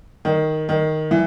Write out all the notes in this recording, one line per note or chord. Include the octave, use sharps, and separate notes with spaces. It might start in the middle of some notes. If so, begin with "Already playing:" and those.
D#3
D#3
E3